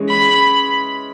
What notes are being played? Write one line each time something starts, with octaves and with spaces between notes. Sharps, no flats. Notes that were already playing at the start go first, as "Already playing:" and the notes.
Already playing: E3 G#3 C#4 G#4
B5